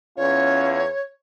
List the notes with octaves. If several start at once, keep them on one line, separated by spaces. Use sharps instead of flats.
E2 C#4 F4 C#5